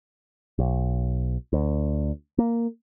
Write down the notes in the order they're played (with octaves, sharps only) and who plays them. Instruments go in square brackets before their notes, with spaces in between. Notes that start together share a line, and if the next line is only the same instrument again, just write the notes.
[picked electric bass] B1
D2
A#3